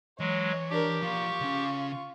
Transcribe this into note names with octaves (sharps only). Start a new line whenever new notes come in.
E3 F#3 G#3 C#5
D4 G4 A#4
F3 F4 D5 C#6
C#3 C#4